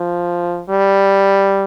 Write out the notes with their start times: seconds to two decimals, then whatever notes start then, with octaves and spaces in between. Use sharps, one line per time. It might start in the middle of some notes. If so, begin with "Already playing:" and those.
Already playing: F3
0.69 G3